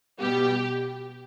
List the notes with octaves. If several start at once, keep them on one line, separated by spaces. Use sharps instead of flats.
B2 G3 B3 G4